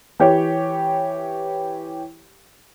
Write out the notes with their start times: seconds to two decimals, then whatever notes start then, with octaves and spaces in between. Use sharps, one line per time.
0.20 E3 G4 C#5